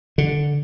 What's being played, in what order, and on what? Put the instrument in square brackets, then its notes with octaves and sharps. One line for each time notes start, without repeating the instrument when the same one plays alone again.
[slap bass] D3